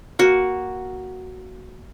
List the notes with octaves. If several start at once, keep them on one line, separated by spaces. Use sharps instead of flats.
A#3 F#4